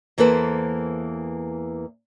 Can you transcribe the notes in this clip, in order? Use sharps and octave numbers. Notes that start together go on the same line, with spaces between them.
E2 E3 A#3 A4 B4 C5